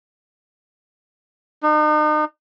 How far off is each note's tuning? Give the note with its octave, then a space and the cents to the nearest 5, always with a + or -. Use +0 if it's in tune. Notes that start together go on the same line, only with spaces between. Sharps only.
D#4 -40